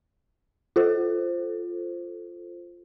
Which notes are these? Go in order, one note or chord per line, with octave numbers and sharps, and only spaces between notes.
F4 A4 C5